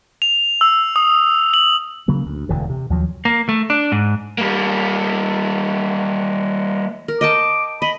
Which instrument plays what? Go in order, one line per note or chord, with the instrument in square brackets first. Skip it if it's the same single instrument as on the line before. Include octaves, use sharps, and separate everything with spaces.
[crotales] F7
E6
D#6
F#7
[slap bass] C#3 F#3 A#3
D2
E1 D2 D3 E3
C3
D#2 F3 F#3
[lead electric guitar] A#3
A3
D4
G#2
G3 A#3
[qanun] A#4
[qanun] D#5 G5 A5 [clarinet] D6
[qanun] D#5 [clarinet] B5